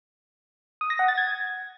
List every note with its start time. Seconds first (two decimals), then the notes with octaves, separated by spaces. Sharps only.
0.81 D#6
0.90 A#6
0.99 F#5
1.08 A6
1.17 G#6